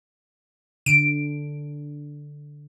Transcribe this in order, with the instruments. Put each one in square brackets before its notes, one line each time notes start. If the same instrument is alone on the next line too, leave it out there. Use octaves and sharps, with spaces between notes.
[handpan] D3 [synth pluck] D7